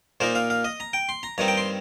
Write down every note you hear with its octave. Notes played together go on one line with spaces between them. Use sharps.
A#2 A#3 D#4 C5
F5
F5
D#5
A#5
G5
C6
A#5
G2 D#3 C4 D#4 A#5
G5
C6